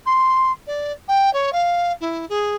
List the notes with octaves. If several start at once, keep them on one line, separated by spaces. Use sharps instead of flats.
C6
D5
G5
C#5
F5
E4
G#4